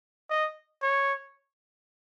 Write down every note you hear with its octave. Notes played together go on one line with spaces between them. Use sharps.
D#5
C#5